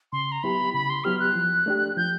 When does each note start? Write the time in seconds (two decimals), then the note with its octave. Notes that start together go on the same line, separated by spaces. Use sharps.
0.12 C#3 C6
0.32 A#5
0.43 F#3 B3 E4 G4 B5
0.74 C#3 B5
0.90 C6
1.04 F#3 B3 E4 G4 F6
1.20 F#6
1.35 F3
1.66 A3 D4 G4
1.97 F3 G6